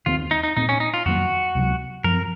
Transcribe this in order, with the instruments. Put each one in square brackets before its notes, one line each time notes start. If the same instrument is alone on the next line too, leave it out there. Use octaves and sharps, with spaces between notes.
[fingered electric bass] D#2 D#3 A3 C4 [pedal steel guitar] F4
[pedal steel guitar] D#4
D#4
[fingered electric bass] A#2 A3 C4 [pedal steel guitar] D#4
[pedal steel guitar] C#4
D#4
F4
[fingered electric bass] F2 D#3 F#3 A#3 [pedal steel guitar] F#4
[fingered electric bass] C#2 C3 D#3 F#3
[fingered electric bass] F#2 F3 C4 [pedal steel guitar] A#4